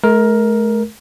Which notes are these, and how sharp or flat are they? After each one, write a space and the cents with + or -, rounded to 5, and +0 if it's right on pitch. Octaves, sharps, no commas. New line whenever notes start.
A3 -45 A#4 +10